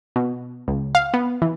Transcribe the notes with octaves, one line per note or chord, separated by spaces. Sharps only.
B2
C#2
F5
B3
E3